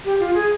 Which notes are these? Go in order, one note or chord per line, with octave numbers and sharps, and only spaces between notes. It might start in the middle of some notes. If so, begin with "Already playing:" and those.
G4
F4
G#4